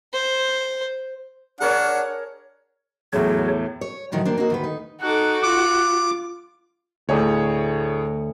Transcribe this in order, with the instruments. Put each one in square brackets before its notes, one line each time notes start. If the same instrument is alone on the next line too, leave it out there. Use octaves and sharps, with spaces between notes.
[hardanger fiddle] C5
[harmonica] D4 F#5 [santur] G#4 A#4 C#5
[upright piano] E2 A2 [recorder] F#3 [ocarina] G#4 [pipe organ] C#5
[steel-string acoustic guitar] C#5
D2 A2 D#3 F3 F#3
A#3 C4 D4
A#3 D#4 F#4
D2 D#3 B4
D#4
[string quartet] D#4 A4 D6 [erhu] F#4 [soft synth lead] F#6
[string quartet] F4 [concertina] D6
[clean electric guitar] D2 [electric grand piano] A2 G#4 C#5